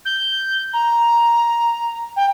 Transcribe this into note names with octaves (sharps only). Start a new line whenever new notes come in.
G6
A#5
G5